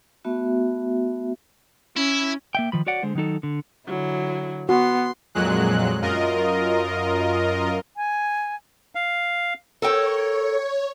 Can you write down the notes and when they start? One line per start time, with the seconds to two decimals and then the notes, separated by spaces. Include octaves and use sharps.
0.25 A3 B3 F#4 E5
1.96 C#4 E4
2.55 A#3 E5 G5
2.72 D#3 F3 B5
2.87 F#4 C#5 D5 F#5
3.03 D3 G#3 C5
3.15 D#3 F#3 D#4 A4
3.43 D3
3.87 D3 F#3 E4
4.69 B3 F#4 C6
5.35 F2 A#2 F#3 G#3 F#6
6.02 F#2 F4 A#4 D#5
7.97 G#5
8.95 F5
9.82 A4 A#4 C#5 G5